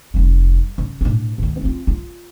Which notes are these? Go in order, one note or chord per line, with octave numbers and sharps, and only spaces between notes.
F1 G3
C#3
A2 D4
D2 D#3
C4 F4
F4